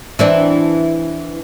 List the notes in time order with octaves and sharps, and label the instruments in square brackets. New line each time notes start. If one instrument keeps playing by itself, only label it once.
[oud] E3 C4 D4